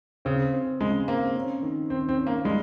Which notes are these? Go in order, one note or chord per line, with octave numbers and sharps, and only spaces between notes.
C#3 C4
C4
C#3 G#3
A#3 C4
C#4
D#3
D#3 C4
C4
C#4
A#3
G3 G#3